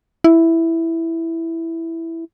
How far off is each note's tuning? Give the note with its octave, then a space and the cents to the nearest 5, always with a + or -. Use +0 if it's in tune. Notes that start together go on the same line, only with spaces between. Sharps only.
E4 +0